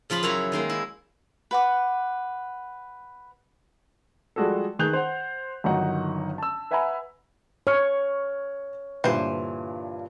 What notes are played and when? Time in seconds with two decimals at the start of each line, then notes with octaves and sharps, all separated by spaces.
0.10 C#3 F3 F4 B5
0.23 F#2 E4 C#5 A#5
0.52 D#3 G#3 A#3
0.70 E4
1.51 B4 F#5 D6
4.36 F3 G3 G#3 F#4 G#4 A4
4.79 D#3 G#4 B4 F#6 G6 F7
4.93 C5 F#5
5.64 G1 D#3 F#3 D#4 F#5 A#5
6.38 A5 E6
6.71 B4 E5 F#5 G#5 A#5 B5
7.67 C#5 C#6 F6 C#7
9.04 G2 A#2 D3 E3 C5